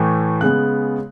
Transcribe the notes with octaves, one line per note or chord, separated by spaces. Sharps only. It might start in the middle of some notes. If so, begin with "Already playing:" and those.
Already playing: A2 E3 A3
C#3 G#3 B3 F#6